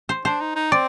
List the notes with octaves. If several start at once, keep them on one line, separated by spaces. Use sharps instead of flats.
C5
D4 C5
D#4
D#4
C4 D5